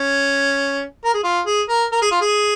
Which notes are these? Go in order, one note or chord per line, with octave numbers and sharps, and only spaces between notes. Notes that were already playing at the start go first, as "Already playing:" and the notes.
Already playing: C#4
A#4
G#4
F4
G#4
A#4
A#4
G#4
F4
G#4